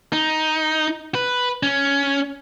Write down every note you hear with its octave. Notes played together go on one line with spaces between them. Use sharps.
D#4
B4
C#4